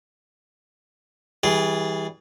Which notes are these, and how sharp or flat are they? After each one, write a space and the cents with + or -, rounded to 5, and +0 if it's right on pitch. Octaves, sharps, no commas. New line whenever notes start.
E3 -30 G3 +0 G#4 +0